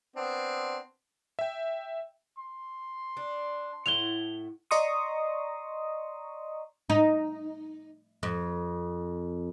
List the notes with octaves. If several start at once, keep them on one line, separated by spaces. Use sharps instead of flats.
B3 C4 D4
E5 G5
C6
D4
A2 E4 F#5 F7 G7
D5 D#5 A#5 C6 C#6 D#6
D#4
F2